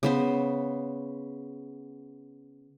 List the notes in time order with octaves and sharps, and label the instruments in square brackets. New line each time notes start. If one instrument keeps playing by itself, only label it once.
[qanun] C#3 B3 C5